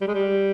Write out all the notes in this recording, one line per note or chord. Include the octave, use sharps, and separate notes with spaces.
G3
G#3
G3